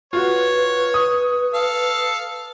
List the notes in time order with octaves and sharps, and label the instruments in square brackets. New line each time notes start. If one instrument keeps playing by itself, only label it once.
[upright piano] F4 F#4 [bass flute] B4 [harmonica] C#5
[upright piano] D#6
[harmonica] A4 F5